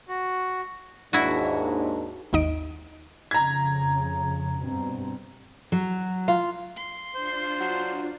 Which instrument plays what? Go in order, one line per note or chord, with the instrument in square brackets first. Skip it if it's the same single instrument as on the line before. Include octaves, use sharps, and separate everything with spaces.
[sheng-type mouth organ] F#4
[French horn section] D#2 G#2 D4 [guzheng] E4 F#4
[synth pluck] G#1 D#2 D#4 D#5 D7
[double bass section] F2 C#3 [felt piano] A#5 G#6
[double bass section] G2 B2 C4
[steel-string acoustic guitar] F#3
[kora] F4
[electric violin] C6
[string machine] D4 F4 [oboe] C5
[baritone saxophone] F#3